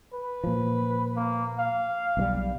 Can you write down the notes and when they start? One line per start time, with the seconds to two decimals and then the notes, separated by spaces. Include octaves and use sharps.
0.14 B4
0.44 A#2 F3
1.17 A#3
1.59 F5
2.17 B1 D#3 G3